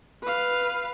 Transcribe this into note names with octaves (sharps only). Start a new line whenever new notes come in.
B4 F5